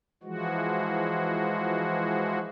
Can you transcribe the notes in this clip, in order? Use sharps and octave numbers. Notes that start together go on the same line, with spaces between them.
E3 F3 G#3 F#4